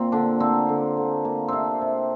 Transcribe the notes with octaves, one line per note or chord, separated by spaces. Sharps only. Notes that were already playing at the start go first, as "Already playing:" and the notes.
Already playing: A#2 A#3 C4
D3 D4
A#3 C4
D3
D3
A#3
C3 C4 D4
C3